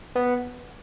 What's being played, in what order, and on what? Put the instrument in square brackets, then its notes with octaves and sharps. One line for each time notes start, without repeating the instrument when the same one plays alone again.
[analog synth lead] B3